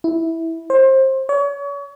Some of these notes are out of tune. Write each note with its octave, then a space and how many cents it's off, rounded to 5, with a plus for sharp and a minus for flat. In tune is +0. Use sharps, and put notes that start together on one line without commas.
E4 -10
C5 +25
C#5 +35